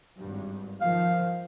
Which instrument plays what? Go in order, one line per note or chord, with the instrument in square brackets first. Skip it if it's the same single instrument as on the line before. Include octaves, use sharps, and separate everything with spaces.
[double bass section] G#1 G2
[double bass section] D#3 F3 [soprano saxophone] F5